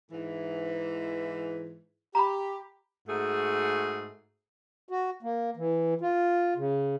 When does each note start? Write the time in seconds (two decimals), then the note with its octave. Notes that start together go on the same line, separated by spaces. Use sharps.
0.11 G#2 E3
2.15 G4 A#5 B5
3.08 G#2 A3 F#4 G#4
4.89 F#4
5.23 A#3
5.57 E3
6.01 F4
6.57 C#3